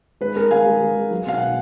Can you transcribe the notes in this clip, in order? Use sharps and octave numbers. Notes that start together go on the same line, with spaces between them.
G#3 B4
G#3 A#4
G#3 F5 G#5
G#3
G#3
G#3
F#3
B2 F5
B2 F#5